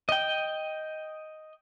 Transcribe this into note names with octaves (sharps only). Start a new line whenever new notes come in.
D#5 G5